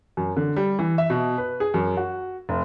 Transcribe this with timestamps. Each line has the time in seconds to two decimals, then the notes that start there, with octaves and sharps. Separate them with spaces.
0.17 F#2
0.37 D3
0.56 G3
0.79 E3
0.98 E5
1.10 B2
1.38 B4
1.60 G#4
1.74 F#2
1.97 F#4
2.49 F1